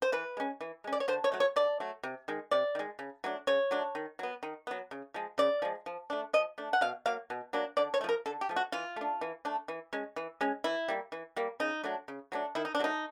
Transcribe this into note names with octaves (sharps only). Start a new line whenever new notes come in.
C5
E3 B4
G#3 C#4
E3
G#3 C#4
D5
C#5
D3 C5
C#5
F#3 A3
C#5
D3 D5
F#3 A3
C3
D#3 G#3
C3 D5
D#3 G#3
C#3
F#3 A3 D4
C#3 C#5
F#3 A3 D4
D#3
F#3 B3
D#3
F#3 B3
C#3
F3 G#3
C#3 D5
F3 G#3
F3
A3 D4
F3 D#5
A3 D4
F#5
B2 F5
F#3 A#3 F5
B2
F#3 A#3 D4
D3 D5
C#5
A3
F3 A#4
D3 A4
G4
F3 A3
F#4
E3 F4
A3 D4
E3
A3 D4
E3
G#3 C#4
E3
G#3 C#4
E3 E4
G3 A#3
E3
G3 A#3
C#3 D#4
F#3 A3 D4
C#3
F#3 A3 D4
D#3 E4
D#4
D4
F#3 A3 D#4